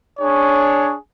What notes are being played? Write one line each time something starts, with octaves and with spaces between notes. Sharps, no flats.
D4 G#4 C#5